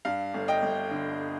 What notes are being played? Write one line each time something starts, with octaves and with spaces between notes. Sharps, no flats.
G2 F5
G1
D#5 G5
G1
D3